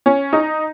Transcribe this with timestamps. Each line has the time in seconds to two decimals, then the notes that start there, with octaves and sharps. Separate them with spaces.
0.06 C#4
0.33 D#4